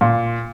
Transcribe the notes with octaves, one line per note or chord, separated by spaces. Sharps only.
A#2